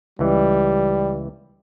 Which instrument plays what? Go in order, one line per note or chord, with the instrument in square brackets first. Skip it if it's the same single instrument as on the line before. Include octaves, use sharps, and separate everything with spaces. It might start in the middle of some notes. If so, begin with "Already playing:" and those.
[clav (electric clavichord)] C#2 E3 [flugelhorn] G3